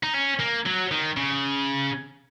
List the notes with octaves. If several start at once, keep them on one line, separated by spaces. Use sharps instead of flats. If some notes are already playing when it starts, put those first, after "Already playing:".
D#4
C#4
A#3
F#3
D#3
C#3